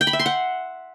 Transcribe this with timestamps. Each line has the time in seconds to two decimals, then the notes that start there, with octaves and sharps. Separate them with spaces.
0.01 G5
0.07 B5
0.13 E5
0.19 C6
0.26 F#5